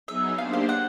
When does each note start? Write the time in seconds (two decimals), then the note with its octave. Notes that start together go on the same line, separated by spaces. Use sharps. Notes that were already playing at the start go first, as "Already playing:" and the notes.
0.08 F#3 B3 D#4 G#4 E5
0.38 A#3 D4 G4 C5 F5
0.53 F5
0.69 F#5